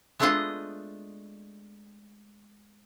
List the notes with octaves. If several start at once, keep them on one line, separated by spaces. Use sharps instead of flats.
G#3 A3 B3 D4 F4 D#5